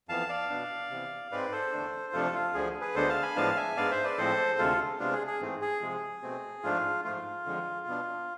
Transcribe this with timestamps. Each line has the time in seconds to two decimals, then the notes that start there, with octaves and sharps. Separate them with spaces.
0.09 F2 E3 B3 F5 A5
0.29 D5 F5
0.49 B2 B3 D4
0.90 C3 E3 B3
1.32 G#2 G#3 C4 B4 D5
1.52 A4 C5
1.72 E2 D3 A3 D4
2.13 F2 C3 F3 A3 D4 F4 A4
2.34 F4
2.54 D2 D3 F3 G#4
2.81 G#4 B4
2.95 D2 D3 G#3 B3 D4 A4 C5
3.09 F5 A5
3.22 G#5 B5
3.36 A2 F3 G#3 B3 D4 F5 A5
3.56 E5 G#5
3.77 G#2 G#3 B3 D4 D5 F5
3.91 C5 E5
4.04 B4 D5
4.18 A2 F3 G#3 C4 A4 C5
4.58 D2 C3 G#3 F4 A4
5.00 C3 G#3 B3 D4 F4
5.13 G#4
5.27 G#4
5.41 G#2 E3 A3 C4
5.62 G#4
5.82 C3 F3 G#3
6.22 B2 A3 C4
6.63 G#2 F3 A3 D4 F4
7.05 G#2 F3 A3 F4
7.45 F2 D3 F3 G#3
7.86 B2 B3 D4